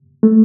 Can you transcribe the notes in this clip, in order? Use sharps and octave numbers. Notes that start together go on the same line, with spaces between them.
A3